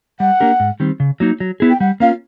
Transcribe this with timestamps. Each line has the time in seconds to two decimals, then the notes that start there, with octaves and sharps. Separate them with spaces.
0.20 G3 F#5
0.40 A#3 D4 G4 A#4
0.60 G#2
0.80 D#3 G3 C4
1.00 C#3
1.20 F#3 A#3 D#4
1.40 F#3
1.60 B3 E4 G#4
1.70 G5
1.80 G3 F#5
2.00 A#3 C#4 F4 F5